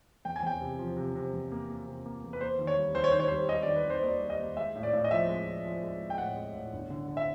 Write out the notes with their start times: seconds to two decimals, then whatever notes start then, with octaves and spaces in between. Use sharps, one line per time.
0.25 E2 G5
0.36 G#5
0.43 E2 G5
0.61 C3
0.79 F3
0.97 C3
1.15 C3
1.33 E2
1.52 A#3
1.69 A#3
1.86 C3
2.06 A#3
2.23 E2
2.33 B4
2.41 A#3 C5
2.59 D#2
2.67 C#5
2.77 G3
2.95 D#2 C5
3.04 C#5
3.12 D#3 C5
3.20 C#5
3.28 G3 C5
3.49 G3 D#5
3.62 D#3 D5
3.76 B4
3.85 D#2 C5
4.03 A#3 D5
4.20 G3
4.30 D#5
4.39 A#3
4.57 G#3 E5
4.75 A2
4.83 D5
4.93 A2
5.04 D#5
5.11 F3 E5
5.29 G#3
5.47 F3
5.65 F3
5.83 G#3
6.01 G#3
6.10 G5
6.18 A2 F#5
6.36 G#3
6.55 A2
6.73 G1
6.90 D3
7.08 D3
7.17 E5